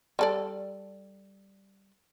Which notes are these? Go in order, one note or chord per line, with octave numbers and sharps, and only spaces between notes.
G3 A4 D5